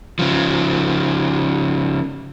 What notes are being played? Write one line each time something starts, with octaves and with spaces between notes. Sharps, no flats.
C#3 F3